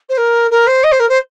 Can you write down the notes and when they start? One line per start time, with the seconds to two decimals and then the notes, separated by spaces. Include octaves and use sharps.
0.09 C5
0.17 A#4
0.50 A#4
0.67 C5
0.83 D#5
0.91 C5
0.99 A#4
1.09 C5